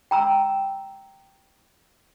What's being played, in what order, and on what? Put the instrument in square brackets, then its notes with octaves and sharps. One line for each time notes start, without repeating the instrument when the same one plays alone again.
[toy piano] G5 A#5 E6